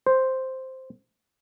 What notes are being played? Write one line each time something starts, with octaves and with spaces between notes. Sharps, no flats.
C5